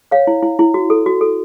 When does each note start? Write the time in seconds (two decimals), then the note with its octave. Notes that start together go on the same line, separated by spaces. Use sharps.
0.11 C#5 F5
0.27 E4
0.43 E4
0.59 E4
0.74 F#4
0.90 A4
1.06 F#4
1.21 A4